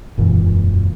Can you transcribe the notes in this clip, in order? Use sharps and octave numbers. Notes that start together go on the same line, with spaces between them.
E1 F#2 A#2 E3